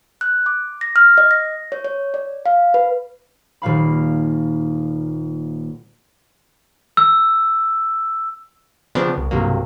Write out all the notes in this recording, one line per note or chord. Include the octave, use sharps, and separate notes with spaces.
F#6
D6
A#6
F6
D#5
A#6
C#5
C#5
D5
F5
B4
D#1 A#2 F5 B5
E6
C#3 F3 B3 C4 D4
C2
B1 G2 C3 F#3 A#3